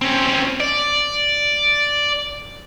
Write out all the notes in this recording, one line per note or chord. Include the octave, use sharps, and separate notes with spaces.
C4 C#4
D5